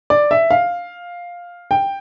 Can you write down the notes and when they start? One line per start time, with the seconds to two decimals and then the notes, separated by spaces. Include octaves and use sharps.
0.10 D5
0.31 E5
0.51 F5
1.71 G5